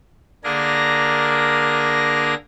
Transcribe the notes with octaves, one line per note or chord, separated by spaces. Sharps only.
D3 A#3 D4 G#4 A#4 A#6